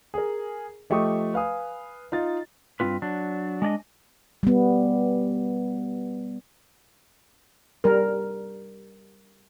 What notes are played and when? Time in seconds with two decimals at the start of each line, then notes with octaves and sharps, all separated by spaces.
0.14 G#4 A#4
0.90 F3 A3 G4 D#5 C#6 D#6
1.34 B4 F5 G#5 D#6
2.12 D#4 F4 A6
2.80 G2 D3 C4 F4 B4
3.02 F#3 D4
3.62 G#3 D4 D5 D#5
4.43 G3 B3
7.84 G3 A#4